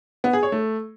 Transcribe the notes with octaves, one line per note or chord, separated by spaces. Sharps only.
B3
G#4
C#5
A3